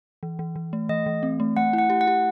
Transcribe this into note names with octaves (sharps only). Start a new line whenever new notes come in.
E3
E3
E3
A3
E3 D#5
E3
C4
A3
A3 F#5
E4
F#5
G4
F#5
G4